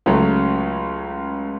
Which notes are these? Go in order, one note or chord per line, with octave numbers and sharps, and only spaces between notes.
C#2 C#3 F#3 A3